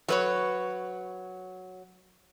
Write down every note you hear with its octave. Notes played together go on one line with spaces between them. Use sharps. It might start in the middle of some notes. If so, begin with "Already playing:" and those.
F#3 B4 C#5